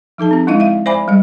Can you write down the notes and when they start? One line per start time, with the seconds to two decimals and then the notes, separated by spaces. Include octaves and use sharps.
0.18 F3 D#4 A4 A5
0.31 C4 G4
0.47 G#3 D4 E4 D#5 F5
0.60 E5 F5
0.86 C5 D5 E5 G#5 B5 D6
1.08 G3 D#5